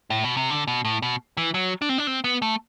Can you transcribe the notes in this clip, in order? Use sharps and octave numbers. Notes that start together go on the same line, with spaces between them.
A2
B2
C3
D3
B2
A2
B2
E3
F#3
D4
C4
D4
C4
B3
A3